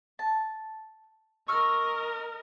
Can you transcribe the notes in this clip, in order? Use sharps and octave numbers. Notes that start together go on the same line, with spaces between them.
A5
A#4 D#5 C#6 E6 F6